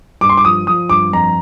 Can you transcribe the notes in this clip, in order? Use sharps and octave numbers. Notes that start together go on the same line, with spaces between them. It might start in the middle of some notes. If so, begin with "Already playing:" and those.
G2 D6
C6
D6
F3 D#6
F3 D#6
G2 D6
F2 A#5